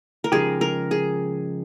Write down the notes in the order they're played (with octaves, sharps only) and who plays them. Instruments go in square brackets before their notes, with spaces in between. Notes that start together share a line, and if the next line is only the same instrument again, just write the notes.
[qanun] A#4
[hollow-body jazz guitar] C#3 F3 G#3 D#4 G4 [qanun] G#4
[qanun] A#4
G#4